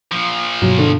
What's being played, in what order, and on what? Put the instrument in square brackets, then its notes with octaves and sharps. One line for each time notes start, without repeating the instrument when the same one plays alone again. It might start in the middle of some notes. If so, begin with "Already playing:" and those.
[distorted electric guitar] A#2 F3
[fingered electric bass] G2 B2 B3 [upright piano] F#3
[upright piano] D3